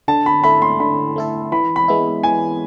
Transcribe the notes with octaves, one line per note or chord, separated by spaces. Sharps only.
D3 A5
B5
A3 E4 A4 B5
C6
D3 B5
A3 E4 A4
E3 B5
B5
G#3 B3 E4
E3 G#5